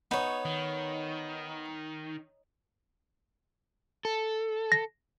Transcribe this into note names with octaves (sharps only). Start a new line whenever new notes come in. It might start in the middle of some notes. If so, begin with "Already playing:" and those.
B3 D#4 C#5
D#3
A4
A#6